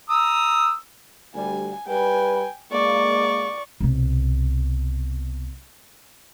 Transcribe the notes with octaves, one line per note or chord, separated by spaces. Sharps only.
A#5 D#6 E6
D2 G3 G#5
G3 B4 G5 G#5
G#3 A#3 D5 C#6
C2 B2